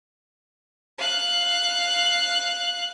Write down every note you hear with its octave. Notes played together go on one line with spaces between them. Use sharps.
F5 F#6